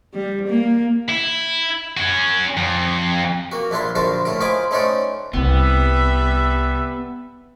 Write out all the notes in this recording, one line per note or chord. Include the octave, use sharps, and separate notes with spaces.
G3
A#3
E4
C#4 F#4
F2
A#3 F#4
A#1 D4 E4 F4 C6
A#1 D3 F4 F#4 C5 A5
A2 A3 A#4
F4 C5 D#5 G#5 B5 D6
A3 C#4 D#4 C5 D5 F#5
C2 G3 B3 B4 E5